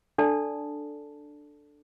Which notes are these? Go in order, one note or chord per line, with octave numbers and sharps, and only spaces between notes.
D4 A4 D5 A5